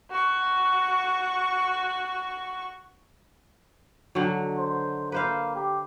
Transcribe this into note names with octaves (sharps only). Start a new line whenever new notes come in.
F#4 C#6
D3 D#3 F#3
C5
A#3 B4 C5 F5
G4